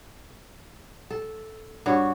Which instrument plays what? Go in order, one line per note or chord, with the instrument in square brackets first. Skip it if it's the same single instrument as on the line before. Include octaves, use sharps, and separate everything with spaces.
[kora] A4
G2 D4 F#4 C#5